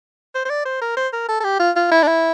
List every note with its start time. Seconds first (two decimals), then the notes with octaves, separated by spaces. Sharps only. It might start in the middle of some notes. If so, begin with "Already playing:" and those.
0.35 C5
0.46 C5
0.50 D5
0.65 C5
0.82 A#4
0.97 C5
1.13 A#4
1.29 A4
1.40 A4
1.44 G4
1.60 F4
1.76 F4
1.91 E4
2.03 D4
2.07 E4